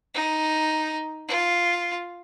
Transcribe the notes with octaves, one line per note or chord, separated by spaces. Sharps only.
D#4
F4